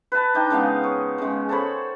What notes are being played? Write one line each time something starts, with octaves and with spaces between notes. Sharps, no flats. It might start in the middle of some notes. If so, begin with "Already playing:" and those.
B4 A5
D4 D#4 G5
C#3 G#3 B3 F5
C#5
C#3 G#3
A4 C5 C#5 B5